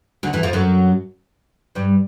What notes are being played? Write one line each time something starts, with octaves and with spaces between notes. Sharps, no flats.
D2 D3
E2 E3
F2 F3
F#2 F#3
G2 G3